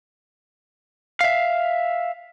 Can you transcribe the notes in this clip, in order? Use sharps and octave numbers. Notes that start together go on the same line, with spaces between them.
E5 F5